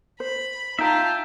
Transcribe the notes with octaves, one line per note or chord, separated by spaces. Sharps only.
C5 B5
D#4 F4 E5 G5 A5 A#5